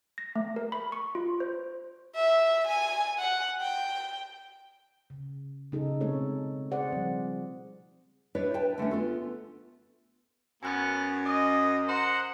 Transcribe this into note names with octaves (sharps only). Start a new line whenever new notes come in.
A#6
A3
A#4
B5
C#6
F4
C5
E5
G#5
F#5
G5
C#3
C#3 F#3 D#4 G#4 A4
B2 G#3 A3 C4 A4 C#5
G#4 C5 D5 F#5
F3 G3 C4
D4 E4 B4 C#5
B4 G5 A5
D3 A3 B3 C#4
B3 F4 A4
F#2 B3 C#4 G#5 F#6 A6
D#5 D6 D#6
C5 F#5 A#5